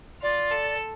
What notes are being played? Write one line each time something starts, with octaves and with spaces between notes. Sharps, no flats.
F4 D5
A4